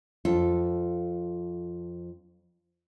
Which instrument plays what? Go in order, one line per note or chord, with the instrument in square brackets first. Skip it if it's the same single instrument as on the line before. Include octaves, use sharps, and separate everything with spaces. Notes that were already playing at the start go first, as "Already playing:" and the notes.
[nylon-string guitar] F2 F4 A4